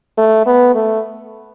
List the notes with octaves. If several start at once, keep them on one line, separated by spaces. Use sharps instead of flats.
A3
B3
A3